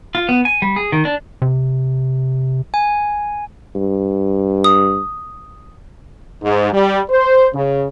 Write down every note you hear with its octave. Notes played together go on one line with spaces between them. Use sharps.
F4
B3
G#5
G3
G#4
D#3
D4
C3
G#5
G2
D#6
G#2
G3
C5
C#3